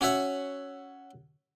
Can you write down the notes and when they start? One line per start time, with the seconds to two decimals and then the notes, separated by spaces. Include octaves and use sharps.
0.01 C#4 F#4 C#5 E5 F#5